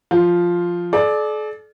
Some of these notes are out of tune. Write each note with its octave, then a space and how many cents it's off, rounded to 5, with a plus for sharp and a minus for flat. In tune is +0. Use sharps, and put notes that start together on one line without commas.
F3 +0 F4 +0
A4 -45 D5 +10